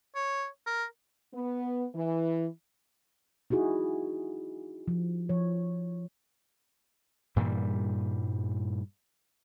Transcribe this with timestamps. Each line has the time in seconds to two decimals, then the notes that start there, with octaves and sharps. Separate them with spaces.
0.15 C#5
0.66 A#4
1.34 B3
1.95 E3
3.50 D#4 E4 F#4 G#4
4.88 F3
5.29 F3 C#5
7.36 G2 A#2 E3 G3